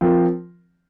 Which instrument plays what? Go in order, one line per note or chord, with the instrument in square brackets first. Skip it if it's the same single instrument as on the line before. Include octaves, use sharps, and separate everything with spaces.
[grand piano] F3 C4 F4 A#4